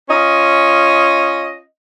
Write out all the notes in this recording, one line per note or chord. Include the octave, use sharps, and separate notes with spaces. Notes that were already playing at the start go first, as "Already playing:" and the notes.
C#4 F4 D#5